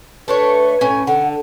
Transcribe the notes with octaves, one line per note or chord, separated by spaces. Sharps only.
A3 D4 B4 C#5
A2 C#4 G#5
D3 F#5